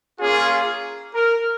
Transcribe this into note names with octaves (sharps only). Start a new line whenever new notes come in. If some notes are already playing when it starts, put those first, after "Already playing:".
A#3 C#4 F4 G#4
A#4